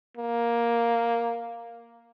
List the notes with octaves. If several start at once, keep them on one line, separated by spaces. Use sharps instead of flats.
A#3